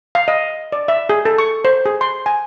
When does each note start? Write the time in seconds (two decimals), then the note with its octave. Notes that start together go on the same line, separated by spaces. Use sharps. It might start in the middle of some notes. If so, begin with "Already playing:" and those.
0.15 F5
0.28 D#5
0.72 D5
0.88 E5
1.09 G#4
1.25 A4
1.38 C#6
1.65 C5
1.86 G#4
2.01 C6
2.26 G#5